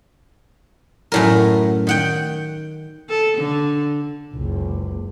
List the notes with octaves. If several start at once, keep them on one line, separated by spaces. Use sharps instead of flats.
F#2 A2 A#4
D#3 F#5 G5
A4
D3
F#1 C#2